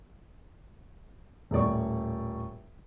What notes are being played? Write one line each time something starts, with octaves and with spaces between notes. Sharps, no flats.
D#1 A2 D5 C#6